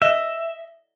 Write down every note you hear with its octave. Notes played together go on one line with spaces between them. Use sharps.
D#5 E5